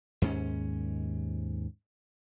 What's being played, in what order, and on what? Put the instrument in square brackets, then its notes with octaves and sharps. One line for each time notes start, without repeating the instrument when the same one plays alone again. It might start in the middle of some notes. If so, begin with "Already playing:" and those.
[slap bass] D#2 G#2 A3 C#4